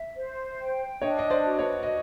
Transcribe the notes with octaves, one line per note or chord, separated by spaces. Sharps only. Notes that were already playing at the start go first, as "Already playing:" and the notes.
Already playing: E5
C5
G5
D4 C#5 D#5
D#5
C5 D5
F#4
B4 C#5
D#5